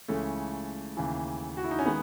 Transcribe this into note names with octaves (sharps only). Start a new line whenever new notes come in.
C#2 C#3 E3 A3 C#4
D#2 C#3 E3
F#4
E4
D#4
C#4
D#3 G#3 B3